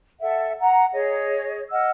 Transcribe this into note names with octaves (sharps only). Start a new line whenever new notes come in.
A4 E5 F#5
F#5 A#5
G#4 C#5 D#5
D#5 F#5 E6 F6